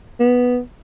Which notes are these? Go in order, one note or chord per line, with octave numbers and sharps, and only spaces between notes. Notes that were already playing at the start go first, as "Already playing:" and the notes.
B3